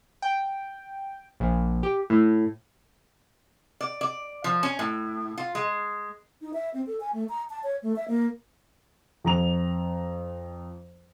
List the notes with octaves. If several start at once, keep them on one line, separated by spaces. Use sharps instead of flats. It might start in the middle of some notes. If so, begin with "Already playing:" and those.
G5
A#1
G4
A2
D5
D5
F3
C#4
A2
F4
G#3
D#4
E5
C4
A4
G#5
A3
A#5
A5
C#5
A3
E5
A#3
F2 A#5 F7